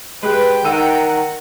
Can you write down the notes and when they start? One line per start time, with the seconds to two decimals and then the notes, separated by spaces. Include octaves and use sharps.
0.23 G#3 G4 B4 G5
0.65 D#3 F#5 A#5 E6 D#7